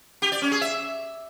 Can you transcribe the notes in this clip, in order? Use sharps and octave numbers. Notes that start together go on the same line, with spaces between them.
G4
D5
C#4
G#4
E5